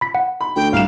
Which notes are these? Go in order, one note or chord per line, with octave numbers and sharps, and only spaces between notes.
B5 B6
F#5
B5
D2 G5
C2 F5 E7